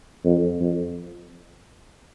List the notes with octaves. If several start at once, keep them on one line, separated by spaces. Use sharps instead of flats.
F2
F2